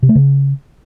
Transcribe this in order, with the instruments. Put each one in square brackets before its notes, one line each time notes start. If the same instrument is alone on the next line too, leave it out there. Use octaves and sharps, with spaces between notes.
[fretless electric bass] C3
A3
C#3